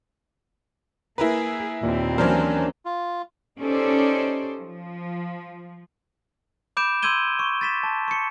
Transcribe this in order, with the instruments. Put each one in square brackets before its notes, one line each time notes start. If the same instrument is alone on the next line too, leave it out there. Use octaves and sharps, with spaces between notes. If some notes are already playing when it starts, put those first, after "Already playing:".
[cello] A#3 G#4 [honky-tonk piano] E4 A#4 B4
[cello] D#2 C4 [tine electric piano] A#2
[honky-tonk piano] E3 F#3 C5 [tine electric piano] C#4 D4 A#4
[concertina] F4
[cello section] C#4 D#4 G4 A4 C5 D5
F3
[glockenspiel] B5 D6 G6 D7 E7
C6 E6 G6 G#6 D#7 G7
C#6
A6 B6 E7
A5
C#6 C#7